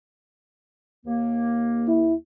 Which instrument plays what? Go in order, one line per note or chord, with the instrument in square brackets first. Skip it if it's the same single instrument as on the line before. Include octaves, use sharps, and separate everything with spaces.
[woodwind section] D#2 A#3
[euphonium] E4